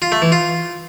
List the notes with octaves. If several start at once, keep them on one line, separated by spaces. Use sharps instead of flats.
F4
A3
E3
F4